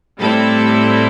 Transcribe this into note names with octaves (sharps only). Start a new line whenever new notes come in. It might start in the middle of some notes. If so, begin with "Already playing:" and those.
A2 G3 C4 E4 A4